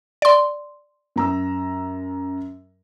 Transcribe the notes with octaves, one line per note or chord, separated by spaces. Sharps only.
D5 C6
F#2 A#5 E6